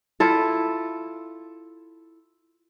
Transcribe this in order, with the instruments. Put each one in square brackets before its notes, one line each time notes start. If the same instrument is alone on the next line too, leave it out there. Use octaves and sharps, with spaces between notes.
[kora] E4 F4 A4